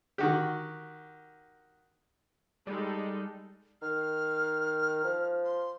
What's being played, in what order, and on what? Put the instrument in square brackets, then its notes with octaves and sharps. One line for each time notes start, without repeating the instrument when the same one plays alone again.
[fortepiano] D#3 F#4 G4
[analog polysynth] G3 [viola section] G#3 D#4 A4
[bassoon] D#3 [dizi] F6
[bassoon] F3
[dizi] C6